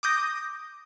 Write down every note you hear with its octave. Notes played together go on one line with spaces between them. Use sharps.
D6 D#6 G6 A#6